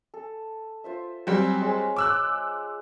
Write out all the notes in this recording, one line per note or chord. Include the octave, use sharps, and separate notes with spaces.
A4
F4 C5 E5
F#3 G3 C4 G#5
G#3 C5 C#5
D6 E6 F#6